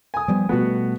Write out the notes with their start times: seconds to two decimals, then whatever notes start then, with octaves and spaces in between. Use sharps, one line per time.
0.14 G#5 D#6
0.28 F3 G3 B3
0.49 B2 G3 A3 B3 F#4